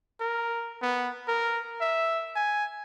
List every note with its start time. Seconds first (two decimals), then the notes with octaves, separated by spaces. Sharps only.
0.20 A#4
0.82 B3
1.28 A#4
1.81 E5
2.35 G#5